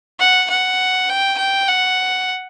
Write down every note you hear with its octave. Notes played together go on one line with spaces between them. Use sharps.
F#5
F#5
G5
G5
F#5